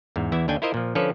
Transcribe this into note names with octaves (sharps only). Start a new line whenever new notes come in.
E2 G#2
E2 E3 E4 E5
D#2 D3 D4 G5 G#5
E4 F4 A#4 C5 D#5 E5
A#2 F3
D3 F3 C#4 A4 B4 C#5